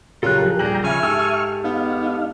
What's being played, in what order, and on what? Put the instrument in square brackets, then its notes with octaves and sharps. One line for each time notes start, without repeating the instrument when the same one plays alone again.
[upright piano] A#1 C#3 F#3 [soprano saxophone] F4 [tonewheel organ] G4 A#4 [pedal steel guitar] A4 F#6
[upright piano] F3 G#4
[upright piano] A#1 D#2 F#7 [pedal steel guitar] G3 [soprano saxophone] G#4 [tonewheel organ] G5 A#5
[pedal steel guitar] C#3 [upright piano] F3 [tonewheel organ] E5 C#6 F6 [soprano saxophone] G#5
[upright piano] G#2 [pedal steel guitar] G4 A4 E6
[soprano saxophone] B3 [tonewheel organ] D#4 F5